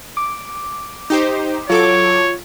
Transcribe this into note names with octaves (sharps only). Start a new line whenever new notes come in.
D6
D#4 G4 C5
F#3 F4 A4 C#5 D6